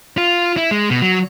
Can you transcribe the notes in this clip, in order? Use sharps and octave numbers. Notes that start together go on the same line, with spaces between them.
F4
E4
G#3
B2
F#3